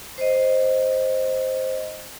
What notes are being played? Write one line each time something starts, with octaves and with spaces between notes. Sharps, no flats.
C5 D#5